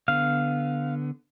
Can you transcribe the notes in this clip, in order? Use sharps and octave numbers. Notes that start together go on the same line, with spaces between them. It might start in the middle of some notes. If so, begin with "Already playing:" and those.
D3 B3 F5